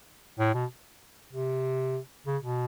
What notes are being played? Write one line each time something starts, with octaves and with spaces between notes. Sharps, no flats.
A2
B2
C3
C#3
B2